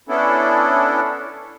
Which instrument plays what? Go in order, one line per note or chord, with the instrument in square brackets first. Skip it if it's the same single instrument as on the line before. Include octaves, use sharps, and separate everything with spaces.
[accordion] B3 C#4 D4 E4 A4